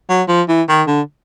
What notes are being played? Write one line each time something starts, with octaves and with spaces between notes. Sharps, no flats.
F#3
F3
E3
D#3
D3